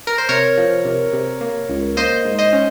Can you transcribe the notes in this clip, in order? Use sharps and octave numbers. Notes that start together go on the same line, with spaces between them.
A#4
C5
C3 A#4 C#5
F3
C3
C3
A#3
C#2
A#3 C5 D#5
G#2
C5 D#5
C#4